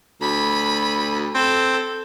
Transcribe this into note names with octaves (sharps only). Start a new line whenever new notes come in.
D2 B5
C4 A4